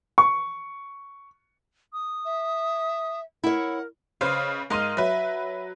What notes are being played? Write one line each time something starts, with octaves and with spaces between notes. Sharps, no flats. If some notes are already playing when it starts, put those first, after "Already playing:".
C#6
D#6
E5
E4 A#4 C#5 F#5
C#3 B4 C5 D#5 F5
G#2 A#4 D#5 F5 C6 D#7
F#3 B4 E5